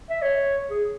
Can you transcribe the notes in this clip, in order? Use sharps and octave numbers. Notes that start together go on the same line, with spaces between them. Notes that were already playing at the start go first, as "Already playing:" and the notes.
E5
C#5
G#4